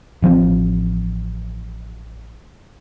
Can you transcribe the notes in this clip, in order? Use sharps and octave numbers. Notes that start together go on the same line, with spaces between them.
A1 F3 G#3 C4